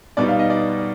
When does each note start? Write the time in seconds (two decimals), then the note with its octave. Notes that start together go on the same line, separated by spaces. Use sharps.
0.17 B2 G3 B3 D#4 D5
0.28 F5
0.39 D#5
0.50 D5